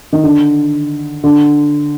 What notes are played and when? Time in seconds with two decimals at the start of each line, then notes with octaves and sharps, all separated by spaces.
0.13 D#3
0.24 D3
1.24 D3